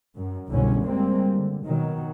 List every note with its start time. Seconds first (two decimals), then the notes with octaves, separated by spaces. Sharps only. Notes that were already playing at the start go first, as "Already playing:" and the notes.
0.16 F#2
0.49 F#1 C2 B2 D3 C#4
0.85 G3 G#3 A#3 C4
1.34 D3
1.65 B2 D#3 F#3